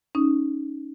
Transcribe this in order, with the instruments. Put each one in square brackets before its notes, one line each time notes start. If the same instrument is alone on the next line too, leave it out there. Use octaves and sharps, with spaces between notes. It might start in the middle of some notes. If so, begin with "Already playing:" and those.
[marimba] C#4 D#4 D#6